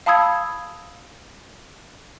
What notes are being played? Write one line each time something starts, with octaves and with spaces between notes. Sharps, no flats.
F5 A5 B5 D#6 E6 G#6